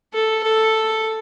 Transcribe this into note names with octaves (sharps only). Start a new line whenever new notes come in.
A4
A4